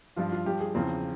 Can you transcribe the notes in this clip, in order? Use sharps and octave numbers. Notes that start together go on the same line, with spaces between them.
G2 F3 F4
F4
G2 F3 G4
G#4
E2 C#3 F3 C4